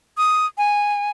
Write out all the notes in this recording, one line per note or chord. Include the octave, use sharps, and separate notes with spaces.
D#6
G#5